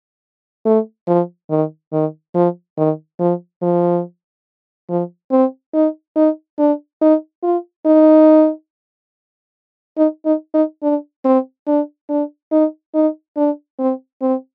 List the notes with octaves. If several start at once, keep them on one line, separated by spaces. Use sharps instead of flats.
A3
F3
D#3
D#3
F3
D#3
F3
F3
F3
C4
D#4
D#4
D4
D#4
F4
D#4
D#4
D#4
D#4
D4
C4
D4
D4
D#4
D#4
D4
C4
C4